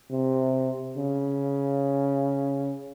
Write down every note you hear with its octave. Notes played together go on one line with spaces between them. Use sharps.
C3
C#3